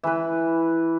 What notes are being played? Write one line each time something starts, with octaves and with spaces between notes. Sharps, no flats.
E3 B4